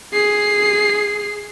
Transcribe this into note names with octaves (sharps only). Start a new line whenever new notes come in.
G#4 C7